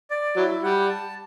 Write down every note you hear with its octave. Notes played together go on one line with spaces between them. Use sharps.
D5
F#3 E4
G3 F#5
A5